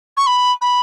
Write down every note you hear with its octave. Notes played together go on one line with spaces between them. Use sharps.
C#6
B5
B5